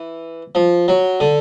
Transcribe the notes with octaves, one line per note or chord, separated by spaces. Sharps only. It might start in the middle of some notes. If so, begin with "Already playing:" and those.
Already playing: E3
F3
F#3
D3